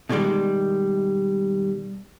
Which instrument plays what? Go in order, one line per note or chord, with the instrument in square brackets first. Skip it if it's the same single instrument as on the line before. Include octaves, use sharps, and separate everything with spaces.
[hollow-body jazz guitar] B2 D3 D#3 G3 G#3